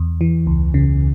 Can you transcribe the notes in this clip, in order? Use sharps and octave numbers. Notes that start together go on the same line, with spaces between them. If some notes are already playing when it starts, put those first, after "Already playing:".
Already playing: E2
E3
C#2
C#3